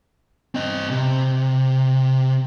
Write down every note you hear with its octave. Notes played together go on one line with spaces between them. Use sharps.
C4 D#5
C3